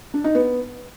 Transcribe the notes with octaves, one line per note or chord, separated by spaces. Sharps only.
D4
D#4
B3